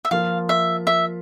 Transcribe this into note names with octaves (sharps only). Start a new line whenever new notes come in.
E5
F3 A#3 F4 F5
E5
E5